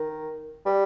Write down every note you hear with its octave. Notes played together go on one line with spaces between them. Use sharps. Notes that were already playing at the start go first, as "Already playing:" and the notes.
Already playing: D#3
G3